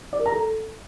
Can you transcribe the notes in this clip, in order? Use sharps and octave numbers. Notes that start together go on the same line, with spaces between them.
D5
A#4
A#5
A4